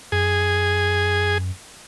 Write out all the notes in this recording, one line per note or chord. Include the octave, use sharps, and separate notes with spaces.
F#2 G#4